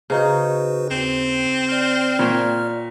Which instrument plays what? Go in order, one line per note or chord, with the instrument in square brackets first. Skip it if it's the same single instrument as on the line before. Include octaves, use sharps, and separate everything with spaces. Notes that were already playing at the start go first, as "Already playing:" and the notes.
[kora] C#3 D#4 [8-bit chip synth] F#4 B4 C5
[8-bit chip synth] D#2 [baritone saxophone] C4
[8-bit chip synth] D5 F6
[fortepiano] A#2 [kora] C#5 G5